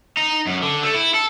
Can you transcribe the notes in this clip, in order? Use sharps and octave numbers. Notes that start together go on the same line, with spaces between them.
D#4
F#2
D3
A3
E4
A4